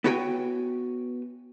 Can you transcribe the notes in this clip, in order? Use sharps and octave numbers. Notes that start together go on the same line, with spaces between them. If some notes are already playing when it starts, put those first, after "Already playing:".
B3 E4 F#4 C#5 G5 G#5